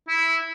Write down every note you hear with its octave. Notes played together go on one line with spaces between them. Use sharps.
E4